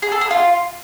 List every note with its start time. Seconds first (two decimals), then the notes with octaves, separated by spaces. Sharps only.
0.02 G#4
0.12 A4
0.21 G#4
0.31 F4